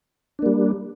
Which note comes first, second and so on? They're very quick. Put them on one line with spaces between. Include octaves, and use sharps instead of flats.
D4 A#3 G3